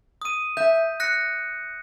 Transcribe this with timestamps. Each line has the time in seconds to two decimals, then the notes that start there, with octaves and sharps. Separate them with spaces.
0.21 D#6 D#7
0.57 E5 G6
1.00 F#6 A#6 C#7